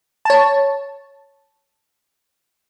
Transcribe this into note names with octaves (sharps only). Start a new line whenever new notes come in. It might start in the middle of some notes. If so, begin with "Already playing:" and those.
C#5 A5